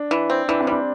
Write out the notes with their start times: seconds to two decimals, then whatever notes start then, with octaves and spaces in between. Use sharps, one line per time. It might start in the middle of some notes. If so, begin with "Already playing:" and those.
Already playing: D4
0.11 E3
0.30 C4
0.48 E3 D4
0.61 C4
0.67 G3 D4